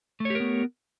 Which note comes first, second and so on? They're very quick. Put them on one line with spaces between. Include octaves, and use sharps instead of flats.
A3 C#5 G4 A#4 B3